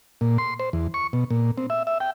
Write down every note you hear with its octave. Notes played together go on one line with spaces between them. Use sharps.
A#2
C6
C5
E2
C#6
B2
A#2
C4
E5
E5
G5